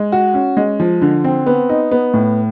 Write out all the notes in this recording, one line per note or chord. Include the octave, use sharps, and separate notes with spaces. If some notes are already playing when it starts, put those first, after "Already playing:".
Already playing: G#3
F#4
C#4
G#3
F3
D3
C4
B3
D#4
B3
A2